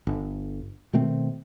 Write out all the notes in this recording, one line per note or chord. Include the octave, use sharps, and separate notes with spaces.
G1
B2 D#3 A3 C4